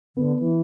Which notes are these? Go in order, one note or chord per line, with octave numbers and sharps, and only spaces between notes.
D3 B3
E3